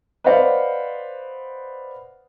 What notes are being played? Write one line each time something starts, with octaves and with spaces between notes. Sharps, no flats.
B4 C5 D5 D#5 F5 F#5